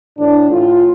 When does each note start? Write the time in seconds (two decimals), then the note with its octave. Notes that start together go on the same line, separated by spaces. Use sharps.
0.17 A2 E3 D4
0.51 A2 E3 F4